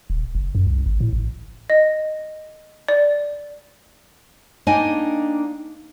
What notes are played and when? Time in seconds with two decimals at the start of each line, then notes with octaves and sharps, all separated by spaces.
0.10 D#1
0.35 F#1
0.55 F#2
0.67 C2
0.86 G#1
1.01 A2
1.13 A1
1.70 D#5
2.88 D5
4.67 A#3 D4 D#4 D#5 G5 G#5